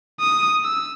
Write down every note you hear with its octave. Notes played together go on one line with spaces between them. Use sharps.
D#6
E6